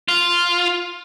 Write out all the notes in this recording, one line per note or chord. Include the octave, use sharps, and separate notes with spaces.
F4